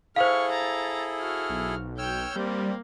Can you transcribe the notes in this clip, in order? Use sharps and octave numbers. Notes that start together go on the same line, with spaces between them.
E4 G#4 A4 C5 F5 C#6 F6
A#5 A6
F#4 F6
B1
C#5 G5 E6 F6 G6
G3 A#3 C4